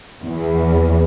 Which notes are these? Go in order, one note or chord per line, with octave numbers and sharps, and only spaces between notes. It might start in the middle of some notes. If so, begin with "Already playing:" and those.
E2